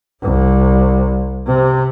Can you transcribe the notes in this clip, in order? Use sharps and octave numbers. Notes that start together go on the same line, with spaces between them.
C2
C3